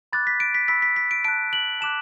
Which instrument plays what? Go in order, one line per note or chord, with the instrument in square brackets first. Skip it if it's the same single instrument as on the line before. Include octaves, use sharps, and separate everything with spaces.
[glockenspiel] B5 D6 F#6 A6
B6
D7
B6
B5 E6 B6
B6
B6
D7
A5 F#6 D7
F#7
A5 D6 F#6 E7